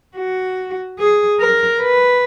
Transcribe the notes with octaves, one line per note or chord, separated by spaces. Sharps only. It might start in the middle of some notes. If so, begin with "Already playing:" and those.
F#4
G#4
A#4
B4